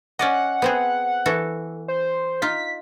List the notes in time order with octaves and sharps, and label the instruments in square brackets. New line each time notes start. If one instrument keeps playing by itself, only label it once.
[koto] C#4 D5 D#5 [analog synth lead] F#5
[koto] B3 C4 G#4
E3 F#4 A4
[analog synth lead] C5
[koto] D#4 F4 [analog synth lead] B6